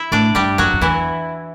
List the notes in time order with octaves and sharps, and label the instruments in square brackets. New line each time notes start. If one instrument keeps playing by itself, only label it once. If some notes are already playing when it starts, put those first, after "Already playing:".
Already playing: [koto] E4 E5
[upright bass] A2 [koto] D4 D5
[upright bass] G2 [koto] G3 G4
[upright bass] F#2 [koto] F#3 F#4
[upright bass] F#2
[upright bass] E2 [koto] E3 E4